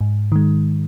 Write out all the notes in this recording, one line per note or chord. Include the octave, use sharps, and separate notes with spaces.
G#2
D#3 G#3